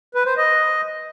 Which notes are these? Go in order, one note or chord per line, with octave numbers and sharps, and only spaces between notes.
B4
C5
D#5